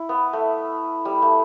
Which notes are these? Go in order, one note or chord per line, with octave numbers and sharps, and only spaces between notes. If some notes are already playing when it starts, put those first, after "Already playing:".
Already playing: E4
B3
A3
G3
A3